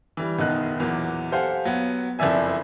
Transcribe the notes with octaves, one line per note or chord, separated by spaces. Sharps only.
E3 G3
F#1 B1 D#3 B3 D#4 F#6
E2 A#2 F#3
G4 A4 C5 F5 F#5 G#5
F#3 B3
F#1 F2 F3 D5 E5 G#5